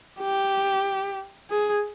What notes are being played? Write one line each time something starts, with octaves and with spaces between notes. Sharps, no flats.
G4
G#4